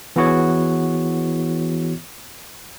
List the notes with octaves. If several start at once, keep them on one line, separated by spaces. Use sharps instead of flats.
E3 B3 E4 F#4 G#4 C#5